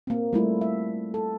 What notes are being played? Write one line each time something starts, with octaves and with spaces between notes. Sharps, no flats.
A#3 C4
G3 A3 E4 F4
E5
A4